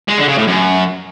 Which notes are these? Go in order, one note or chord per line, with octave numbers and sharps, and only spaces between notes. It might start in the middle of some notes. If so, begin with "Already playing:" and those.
G#3
D3
C#3
A2
F#2